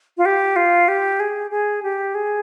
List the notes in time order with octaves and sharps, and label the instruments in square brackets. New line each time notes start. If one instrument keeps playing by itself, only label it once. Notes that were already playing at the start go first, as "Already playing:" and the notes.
[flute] F4
G4
F4
G4
G#4
G#4
G4
G#4